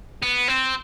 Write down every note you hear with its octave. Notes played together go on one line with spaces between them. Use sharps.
B3
C4